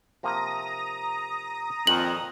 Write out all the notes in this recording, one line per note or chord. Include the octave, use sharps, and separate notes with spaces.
C3 F3 A#3 A#5 D#6 A#6
F2 A#2 D#3 F#7